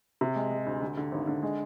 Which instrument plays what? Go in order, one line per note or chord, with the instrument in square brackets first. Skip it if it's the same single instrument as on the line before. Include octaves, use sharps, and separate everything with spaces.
[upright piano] C3
G#3
G#3
D2
D3
D3
G#1
D3
G#3